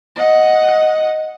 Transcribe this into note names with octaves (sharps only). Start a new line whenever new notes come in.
D#5 F#5